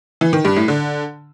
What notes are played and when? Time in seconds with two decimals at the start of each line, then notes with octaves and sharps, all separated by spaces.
0.21 E3
0.33 D#3
0.45 G2
0.56 A2
0.68 D3